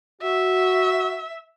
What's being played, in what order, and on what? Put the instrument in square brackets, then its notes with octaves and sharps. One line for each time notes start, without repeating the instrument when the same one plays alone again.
[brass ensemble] F#4 [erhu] E5